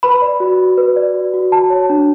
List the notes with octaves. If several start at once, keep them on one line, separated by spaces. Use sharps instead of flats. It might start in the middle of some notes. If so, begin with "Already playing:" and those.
B4 B5
D5
F#4
F#4
B4
D5
F#4
F#4
F#4 A5
C#5
D4